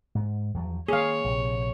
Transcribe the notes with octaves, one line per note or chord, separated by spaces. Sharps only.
G#2
E2 F3 F#3
D#3 A#3 G#4 C#5 F5
A#1 C3